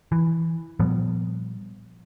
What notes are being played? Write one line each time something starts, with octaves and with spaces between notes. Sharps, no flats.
E3
A#2 F3 G3 B3